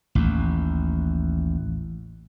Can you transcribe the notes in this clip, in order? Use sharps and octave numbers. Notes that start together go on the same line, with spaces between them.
A1 D#2